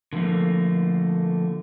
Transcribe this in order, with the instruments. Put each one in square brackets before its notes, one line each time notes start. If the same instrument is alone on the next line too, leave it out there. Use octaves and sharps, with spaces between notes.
[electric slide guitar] D3 F3 A3 A#3